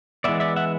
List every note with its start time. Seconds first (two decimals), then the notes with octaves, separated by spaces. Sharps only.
0.24 E3 G#3 B3 D5 E5
0.40 D5 E5
0.56 E5 F#5